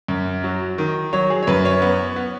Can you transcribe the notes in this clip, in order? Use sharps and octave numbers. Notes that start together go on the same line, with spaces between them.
F#2
F#3
D#3
F#3 C#5
G#4
C#5
F#2 B4
C#5
B3
B3